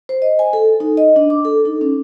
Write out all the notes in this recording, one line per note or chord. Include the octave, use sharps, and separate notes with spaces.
C5
D#5
G#5
A4
D#4
D#5
D4
D6
A4
D#4
C#4